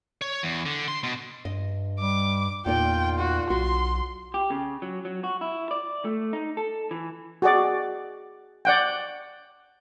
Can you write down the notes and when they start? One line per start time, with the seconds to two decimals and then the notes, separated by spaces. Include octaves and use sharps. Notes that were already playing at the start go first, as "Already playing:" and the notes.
0.22 C#5
0.43 E2
0.66 D3
0.88 C6
1.03 B2
1.45 G2 D#5
2.00 G3 D6
2.66 E2 A#2 D#4 F4 D5 G5
3.19 F#4
3.50 B1 F#4 C6
4.34 G4
4.51 C#3
4.82 F#3
5.05 F#3
5.24 F#4
5.41 E4
5.71 D5
6.05 A3
6.33 D#4
6.57 A4
6.91 E3
7.42 F#4 G#4 D5
8.65 D5 F#5 G5